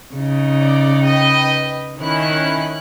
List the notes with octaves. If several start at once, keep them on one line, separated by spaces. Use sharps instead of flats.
C#3 D#4
D5
B4 D#5 G5
D#3 C#4 E4 F#6